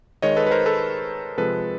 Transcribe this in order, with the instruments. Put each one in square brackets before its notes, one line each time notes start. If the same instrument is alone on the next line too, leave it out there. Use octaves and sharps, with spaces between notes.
[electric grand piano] D#3 G#3 C#5 D#5
A4 B4
B4
A#4 C5
A4 B4
C3 F3 G#3 A4 B4